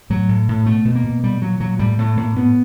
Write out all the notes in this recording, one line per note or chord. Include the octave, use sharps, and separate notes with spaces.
A2 F#3
A2
A2
B2 A3
B2
A#3
B2
A#2 G3
A#2 F#3
A#2 F#3
A2 G3
A2 A3
A2 A#3
A2 B3